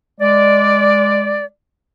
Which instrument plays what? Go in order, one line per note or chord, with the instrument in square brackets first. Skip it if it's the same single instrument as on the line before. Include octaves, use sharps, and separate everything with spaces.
[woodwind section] G#3 D5